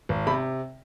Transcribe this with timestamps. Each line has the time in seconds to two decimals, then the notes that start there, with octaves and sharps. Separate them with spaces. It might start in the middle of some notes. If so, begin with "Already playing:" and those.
0.09 G#1
0.27 C3 B5